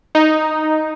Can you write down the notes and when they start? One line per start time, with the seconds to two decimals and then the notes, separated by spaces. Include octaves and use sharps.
0.15 D#4